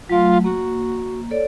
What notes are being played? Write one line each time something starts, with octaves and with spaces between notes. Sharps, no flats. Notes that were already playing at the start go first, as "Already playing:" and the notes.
F#3 A3 F4
A#3 F#4
A4 C#5 D5